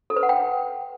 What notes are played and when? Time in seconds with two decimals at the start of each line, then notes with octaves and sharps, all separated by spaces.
0.10 A4
0.16 B4
0.23 F#5
0.29 G5